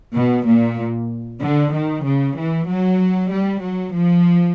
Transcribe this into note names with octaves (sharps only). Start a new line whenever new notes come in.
B2
A#2
D3
D#3
C#3
E3
F#3
G3
F#3
F3